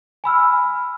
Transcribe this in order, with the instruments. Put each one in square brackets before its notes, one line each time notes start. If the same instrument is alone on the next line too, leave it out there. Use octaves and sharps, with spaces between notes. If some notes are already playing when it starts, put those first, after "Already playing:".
[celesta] G#5 B5 E6 F6